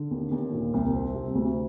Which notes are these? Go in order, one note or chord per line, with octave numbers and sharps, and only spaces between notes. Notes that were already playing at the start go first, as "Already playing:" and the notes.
Already playing: D3
D#2
D#2
A#2
C2
C4
C3
D2